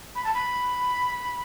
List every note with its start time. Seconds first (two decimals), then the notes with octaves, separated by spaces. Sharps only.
0.15 B5
0.24 A5
0.34 B5